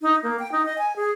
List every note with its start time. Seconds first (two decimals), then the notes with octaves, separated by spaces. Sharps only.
0.02 D#4
0.23 A#3
0.39 G5
0.52 D#4
0.66 D#5
0.78 G#5
0.96 G#4